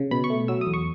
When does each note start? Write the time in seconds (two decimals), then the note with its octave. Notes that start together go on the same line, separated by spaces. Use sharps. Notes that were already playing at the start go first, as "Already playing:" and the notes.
Already playing: C#3
0.11 B2 B5
0.24 C#6
0.30 A3
0.48 F#3 E6
0.61 D#6
0.67 E2
0.74 C#6